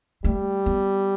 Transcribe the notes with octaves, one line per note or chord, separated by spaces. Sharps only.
G3 A3
B3